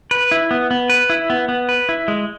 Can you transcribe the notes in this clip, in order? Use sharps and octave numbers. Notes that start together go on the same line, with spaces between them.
B4
E4
B3
B3
B4
E4
B3
B3
B4
E4
G#3